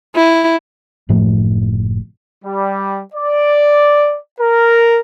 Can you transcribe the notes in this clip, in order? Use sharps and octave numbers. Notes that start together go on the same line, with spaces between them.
E4
F#1 A2 F3 A3
G3
D5
A#4